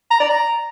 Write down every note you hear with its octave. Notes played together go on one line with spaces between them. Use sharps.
A#5
D5
A#5